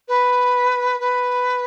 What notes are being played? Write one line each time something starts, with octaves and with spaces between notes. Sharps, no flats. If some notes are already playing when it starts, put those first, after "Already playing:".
B4
B4